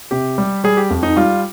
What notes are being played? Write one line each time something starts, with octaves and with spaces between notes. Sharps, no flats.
C3 G4
G3
G3 G#4
G4
F2
D#4
G3 F4